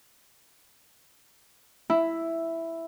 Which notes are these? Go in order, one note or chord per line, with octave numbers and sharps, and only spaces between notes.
E4